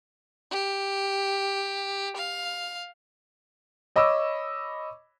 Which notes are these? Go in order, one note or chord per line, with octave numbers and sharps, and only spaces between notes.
G4
F5
C#5 D#5 B5 D6 E6